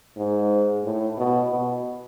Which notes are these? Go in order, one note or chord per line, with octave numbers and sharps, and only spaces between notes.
G#2
A2
B2
B2